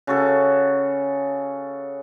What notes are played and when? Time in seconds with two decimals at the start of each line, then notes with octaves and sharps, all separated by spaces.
0.07 C#3 F#4 A4